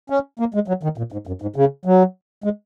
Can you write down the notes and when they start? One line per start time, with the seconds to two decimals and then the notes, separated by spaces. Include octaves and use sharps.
0.10 C#4
0.39 A#3
0.54 G#3
0.68 F#3
0.83 D#3
0.98 A#2
1.12 G#2
1.27 F#2
1.42 G#2
1.56 C#3
1.85 F#3
2.44 G#3